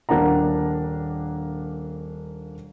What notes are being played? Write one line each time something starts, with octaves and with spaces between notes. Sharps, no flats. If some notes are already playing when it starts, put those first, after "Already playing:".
D#1 A#3 D4 F#5 A#5